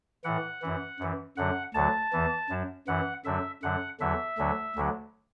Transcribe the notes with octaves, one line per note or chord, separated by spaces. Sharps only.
A2 E3 F#5
F#2 E3
F#2 E3
F#2 D3 F#3 F#5
D2 D3 F#3 A5
E2 E3
F#2 F#3
F#2 E3 F#5
F#2 D3 F#3 E5
F#2 D3 F#3 F#5
E2 D3 F#3 E5
D2 D3 F#3
D2 D3 F#3